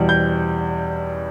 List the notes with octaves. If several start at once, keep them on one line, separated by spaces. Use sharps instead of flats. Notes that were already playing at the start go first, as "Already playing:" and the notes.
Already playing: E2 B2 G3
G6